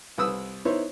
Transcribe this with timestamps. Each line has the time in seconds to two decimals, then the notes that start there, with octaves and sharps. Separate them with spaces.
0.18 C2 B4 D#6 E6
0.65 B3 D#4 E4 C5 C#5